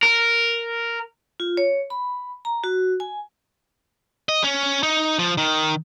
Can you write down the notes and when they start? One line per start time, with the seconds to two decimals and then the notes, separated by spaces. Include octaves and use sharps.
0.03 A#4
1.40 F4
1.57 C#5
1.90 B5
2.45 A#5
2.64 F#4
3.00 G#5
4.29 D#5
4.44 C#4
4.83 D#4
5.19 F3
5.37 D#3